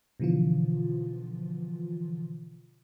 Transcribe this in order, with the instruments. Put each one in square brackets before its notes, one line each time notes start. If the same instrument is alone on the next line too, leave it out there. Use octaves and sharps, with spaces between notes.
[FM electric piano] B2 D3 E3 F3 F4